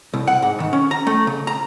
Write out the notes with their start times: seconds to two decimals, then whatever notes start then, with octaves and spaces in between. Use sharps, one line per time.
0.14 C2
0.27 F#5
0.42 G#2
0.60 D#3
0.73 C#4
0.91 A#5
1.07 A3
1.27 C#3
1.47 A#5